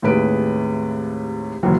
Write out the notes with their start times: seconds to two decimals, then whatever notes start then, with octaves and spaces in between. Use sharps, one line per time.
0.02 D#2 A2 C3 G#3 B4 D7
1.63 F#1 D#2 G#2 E3 F#3